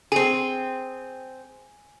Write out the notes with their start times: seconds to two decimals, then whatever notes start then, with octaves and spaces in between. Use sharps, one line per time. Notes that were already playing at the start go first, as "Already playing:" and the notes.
0.12 C4 G#4 G#5